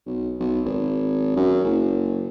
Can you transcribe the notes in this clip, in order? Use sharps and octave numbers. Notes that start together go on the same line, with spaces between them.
B1
B1
G#1
F#2
F#1